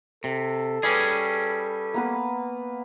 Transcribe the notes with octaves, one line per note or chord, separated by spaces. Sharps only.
C3 A4
G3 C#4 G#4 B4 C#6 D6
A#3 B3 B4